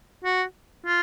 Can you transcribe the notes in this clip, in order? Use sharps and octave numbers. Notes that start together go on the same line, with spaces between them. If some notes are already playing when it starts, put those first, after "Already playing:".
F#4
F4